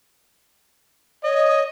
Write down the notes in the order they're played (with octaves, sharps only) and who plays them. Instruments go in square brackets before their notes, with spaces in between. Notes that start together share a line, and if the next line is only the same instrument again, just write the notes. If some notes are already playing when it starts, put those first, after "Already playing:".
[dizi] C#5 [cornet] D#5